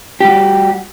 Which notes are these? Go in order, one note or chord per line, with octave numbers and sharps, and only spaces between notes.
G3 F#4 G4